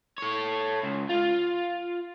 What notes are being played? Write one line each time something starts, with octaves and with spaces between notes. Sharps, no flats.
A4 C#5
C#2
F4